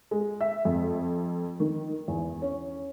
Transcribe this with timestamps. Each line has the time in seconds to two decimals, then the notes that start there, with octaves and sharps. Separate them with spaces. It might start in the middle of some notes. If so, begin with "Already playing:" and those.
0.11 G#3
0.41 E5
0.65 F2
1.60 D#3
2.08 E2
2.42 C#4